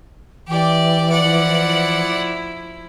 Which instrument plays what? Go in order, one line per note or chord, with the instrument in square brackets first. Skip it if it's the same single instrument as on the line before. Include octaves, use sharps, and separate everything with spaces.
[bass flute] E3 [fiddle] G4 D5
[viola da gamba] F3 E4 [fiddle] D5 F#5